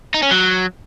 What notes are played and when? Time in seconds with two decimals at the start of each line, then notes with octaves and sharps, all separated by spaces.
0.14 D#4
0.23 C#4
0.31 F#3